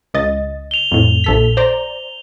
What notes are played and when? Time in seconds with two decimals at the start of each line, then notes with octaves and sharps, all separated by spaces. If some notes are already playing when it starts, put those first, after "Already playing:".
0.14 C#2 D#5 A6
0.71 F7 G7
0.92 F2 A2
1.24 A#1 A4 B6
1.57 C5 D5 A#5